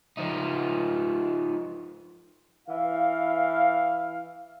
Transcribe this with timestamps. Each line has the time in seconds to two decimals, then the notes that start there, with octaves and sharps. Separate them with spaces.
0.17 F3 D#4
2.68 E3 F5